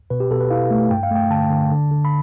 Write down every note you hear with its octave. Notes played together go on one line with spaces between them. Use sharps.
B2 B4
G4
B2 A4
B4
E4 F5
A3
G2 G5
F5
A3 G5
D3 A5
D3
D3
D3
B5